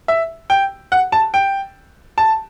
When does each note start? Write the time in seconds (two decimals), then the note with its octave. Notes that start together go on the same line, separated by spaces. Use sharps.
0.08 E5
0.50 G5
0.92 F#5
1.12 A5
1.34 G5
2.18 A5